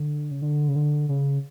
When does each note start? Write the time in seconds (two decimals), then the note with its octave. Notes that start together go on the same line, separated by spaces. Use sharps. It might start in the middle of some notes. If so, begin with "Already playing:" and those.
Already playing: D3
0.31 C#3
0.42 D3
0.68 C#3
0.76 D3
1.09 C#3